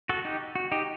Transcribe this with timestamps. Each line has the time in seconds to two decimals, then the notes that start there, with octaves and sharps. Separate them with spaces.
0.09 F#4 A4
0.25 D#4 G4
0.55 F#4
0.72 D#4 G4